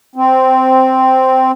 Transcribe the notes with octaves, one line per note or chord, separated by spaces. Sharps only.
C4